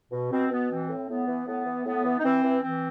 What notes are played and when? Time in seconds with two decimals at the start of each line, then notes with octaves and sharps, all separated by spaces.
0.11 B2
0.31 B2 C4
0.50 B2 B3
0.69 E3 C4
0.89 A2
1.08 A2 B3
1.27 E3
1.46 A2 B3
1.66 E3
1.86 A2 B3
2.04 E3
2.19 D#4
2.24 E3 C4
2.42 E3
2.62 E3 C4